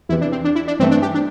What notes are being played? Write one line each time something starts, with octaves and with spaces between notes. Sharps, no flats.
E2 C3 E3 E4
D4
C4
D4
E4
D4
G2 E3 A3 C4
D4
G4
D4